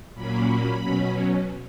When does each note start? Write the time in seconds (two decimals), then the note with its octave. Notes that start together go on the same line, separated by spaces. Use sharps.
0.14 A#2 F#3 A#3 C#4 B5
0.82 B2 F#3 C#4